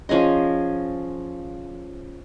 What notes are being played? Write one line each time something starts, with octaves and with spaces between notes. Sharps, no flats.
F3 C#4 G#4 D#5